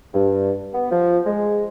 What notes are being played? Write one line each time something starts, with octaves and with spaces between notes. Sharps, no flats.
G2
B3
F3
G#3